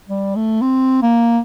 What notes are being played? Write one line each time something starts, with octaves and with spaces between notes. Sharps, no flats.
G3
A3
C4
A#3